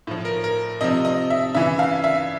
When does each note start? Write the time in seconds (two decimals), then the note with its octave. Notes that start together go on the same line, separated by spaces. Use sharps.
0.07 A2 F3
0.25 A#4
0.44 A#4
0.81 C3 F3 D#5
1.05 D#5
1.30 E5
1.55 C#3 E3 E5
1.79 F5
2.04 E5